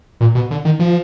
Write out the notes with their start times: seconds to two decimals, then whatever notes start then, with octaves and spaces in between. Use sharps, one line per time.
0.21 A#2
0.35 B2
0.51 D3
0.65 D#3
0.79 F3